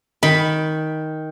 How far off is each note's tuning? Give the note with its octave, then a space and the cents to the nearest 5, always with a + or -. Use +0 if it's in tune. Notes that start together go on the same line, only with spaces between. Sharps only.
D#3 +10 B5 +0